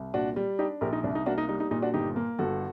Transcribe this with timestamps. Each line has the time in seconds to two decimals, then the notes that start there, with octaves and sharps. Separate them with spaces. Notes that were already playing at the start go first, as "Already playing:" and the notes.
Already playing: C2
0.14 A#2 D4 F#4
0.36 G3
0.59 D4 D#4 G4
0.81 A#1 G4 A#4
0.93 D#4
1.03 C2 D4
1.15 D#4
1.26 A#3 D4 F#4
1.38 D#4
1.49 G3 D#4
1.60 D#4
1.71 A#2 D#4
1.82 D4 F#4
1.94 G1 D#4 G4
2.16 A#3
2.39 G1 F#4 A4